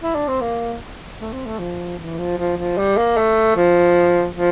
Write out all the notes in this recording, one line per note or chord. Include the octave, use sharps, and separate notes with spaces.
E4
D4
C4
A#3
A3
C4
A3
F3
E3
F3
F3
F3
G3
A#3
A3
F3
F3